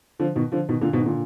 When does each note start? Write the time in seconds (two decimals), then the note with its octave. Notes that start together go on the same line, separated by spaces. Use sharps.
0.19 D3 F3
0.35 B2 D#3
0.52 D3 F3
0.69 B2 D#3
0.81 A#2 D3
0.93 G#2 B2
1.00 D#3
1.06 A#2 D3